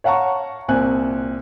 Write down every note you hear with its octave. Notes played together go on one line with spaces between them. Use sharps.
C#5 F5 F#5 A5 A#5 C#6
C2 A#2 C4 G#5 F#6